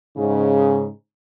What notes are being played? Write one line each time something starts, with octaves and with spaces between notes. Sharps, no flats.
G#2 C#3